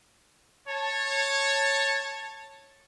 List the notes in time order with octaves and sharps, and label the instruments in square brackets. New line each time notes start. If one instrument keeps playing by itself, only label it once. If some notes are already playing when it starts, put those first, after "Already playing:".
[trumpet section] C#5 A5